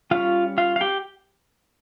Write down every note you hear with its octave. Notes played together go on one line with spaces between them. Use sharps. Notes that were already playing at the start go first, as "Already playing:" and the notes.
G3 C#4 F4 F5
F4 F5
F5
G4 G5